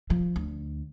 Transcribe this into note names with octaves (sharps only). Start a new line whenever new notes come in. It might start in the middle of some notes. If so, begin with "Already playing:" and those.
F3
D2